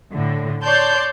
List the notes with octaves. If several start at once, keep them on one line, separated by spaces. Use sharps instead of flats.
A2 D3
C#5 D5 A5 C6 G6